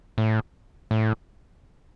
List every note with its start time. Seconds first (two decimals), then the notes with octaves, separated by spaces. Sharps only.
0.18 A2
0.91 A2